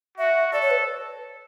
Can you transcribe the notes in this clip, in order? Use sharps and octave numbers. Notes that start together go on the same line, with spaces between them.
F#4 E5
A4 D5
C#5
B4